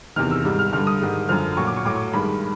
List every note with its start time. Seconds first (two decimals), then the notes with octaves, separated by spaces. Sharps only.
0.16 E2 C3 D#3 F6
0.31 E6
0.45 G#2 D#3 G3
0.59 F6
0.73 G2 D3 G3 F6
0.87 D#6
1.01 G#2 D#3 G3
1.29 F#2 D3 F3 F6
1.57 A#2 F#3 C#6
1.67 D6
1.76 C#6
1.85 A2 F#3 D6
1.95 C#6
2.13 G2 D#3 G#3 B5